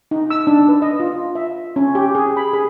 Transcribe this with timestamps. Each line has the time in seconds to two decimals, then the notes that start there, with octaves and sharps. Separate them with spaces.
0.11 D#4
0.30 E6
0.47 D4
0.68 B4
0.82 D#5
1.00 F4
1.35 E5
1.76 C#4
1.95 G4
2.15 G#4
2.37 B5
2.53 G#4